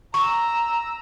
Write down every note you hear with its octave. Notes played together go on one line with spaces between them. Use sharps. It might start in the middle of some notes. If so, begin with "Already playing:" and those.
A#5 C#6 E6